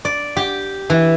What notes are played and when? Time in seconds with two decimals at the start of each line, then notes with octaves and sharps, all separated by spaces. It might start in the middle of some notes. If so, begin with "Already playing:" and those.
0.05 D5
0.37 G4
0.90 E3